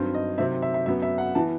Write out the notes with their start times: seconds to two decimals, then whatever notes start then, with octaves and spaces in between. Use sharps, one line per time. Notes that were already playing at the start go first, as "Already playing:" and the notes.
Already playing: G2 D#3 F#3 C4
0.14 D#5
0.38 C3 D#3 F#3 C4 E5
0.62 E5
0.74 E5
0.86 F#2 F#3 B3 E5
1.02 E5
1.18 F#5
1.35 E3 B3 A5